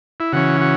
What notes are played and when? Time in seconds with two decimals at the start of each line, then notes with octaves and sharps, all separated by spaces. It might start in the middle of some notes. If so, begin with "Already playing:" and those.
0.20 E4
0.32 C#3 E3 C#4 F#4
0.61 F#4